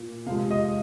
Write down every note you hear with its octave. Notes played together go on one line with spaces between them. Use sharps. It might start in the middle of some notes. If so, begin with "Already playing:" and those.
Already playing: A#2
C3 F3 G#3 F5
D#5